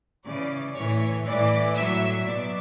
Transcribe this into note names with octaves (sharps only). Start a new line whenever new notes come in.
C#3 E3 D5
A2 E3 C#5
A2 E3 D5
A2 F#3 E5
B2 F#3 D5